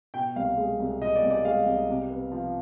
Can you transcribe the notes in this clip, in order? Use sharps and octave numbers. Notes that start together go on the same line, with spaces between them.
B2 G5
C2 F5
G#3
C2
B2 D#5
D5
C2
D5
G#3 F5
C2
C3
B3
F3